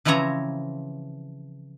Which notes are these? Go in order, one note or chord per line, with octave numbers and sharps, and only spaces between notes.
C#3 E3 F3 C4 C#5 A#5